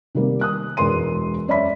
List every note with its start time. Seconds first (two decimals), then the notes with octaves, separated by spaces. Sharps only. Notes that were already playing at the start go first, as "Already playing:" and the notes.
0.15 C3 D#3 G3 A#3
0.41 D#6 F#6
0.77 E1 E2 B3 A#4 C6 D#7
1.48 F#2 C#5 D5 E5 B5 B6